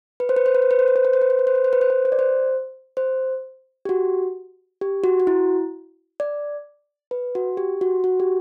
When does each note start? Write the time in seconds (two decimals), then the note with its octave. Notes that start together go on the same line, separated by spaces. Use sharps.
0.20 B4
0.29 C5
0.36 B4
0.46 C5
0.55 B4
0.62 C5
0.71 B4
0.79 C5
0.88 B4
0.96 C5
1.05 B4
1.13 C5
1.21 B4
1.30 C5
1.39 B4
1.47 C5
1.55 B4
1.64 C5
1.73 B4
1.81 C5
1.90 B4
2.05 C5
2.12 D5
2.19 C5
2.97 C5
3.85 G4
3.89 F#4
4.81 G4
5.04 F#4
5.20 F#4
5.27 E4
6.20 D5
7.11 B4
7.35 F#4
7.57 G4
7.81 F#4
8.04 F#4
8.20 G4